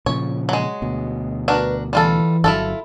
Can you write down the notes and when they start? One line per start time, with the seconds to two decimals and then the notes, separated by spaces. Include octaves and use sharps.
0.06 A#2 C#3 F3 C#5
0.49 F#3 G#3
0.82 D2 B2
1.48 D4 F#4 A#4 B4
1.93 E3 G3 F4 A4
2.44 G1 F#3 E4 F4 A4